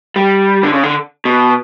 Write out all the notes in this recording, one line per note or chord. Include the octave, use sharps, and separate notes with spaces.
G3
D3
C#3
D3
B2